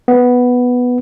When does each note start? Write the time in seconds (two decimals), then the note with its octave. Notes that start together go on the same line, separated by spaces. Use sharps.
0.08 B3